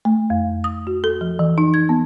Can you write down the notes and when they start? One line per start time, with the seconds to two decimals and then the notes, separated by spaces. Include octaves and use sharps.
0.05 A3
0.30 F2
0.64 D#6
0.87 F#4
1.04 A4
1.21 F3
1.39 E3
1.58 D#4
1.74 G#6
1.89 B3